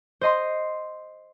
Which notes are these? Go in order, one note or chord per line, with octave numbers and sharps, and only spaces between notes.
C5 D#5 C6